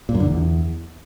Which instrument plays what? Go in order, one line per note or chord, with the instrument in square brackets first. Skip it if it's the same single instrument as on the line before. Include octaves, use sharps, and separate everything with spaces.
[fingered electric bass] A#2
F#2
D3
E2